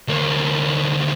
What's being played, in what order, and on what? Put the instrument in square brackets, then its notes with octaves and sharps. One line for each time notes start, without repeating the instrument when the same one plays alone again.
[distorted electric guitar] D2 A#3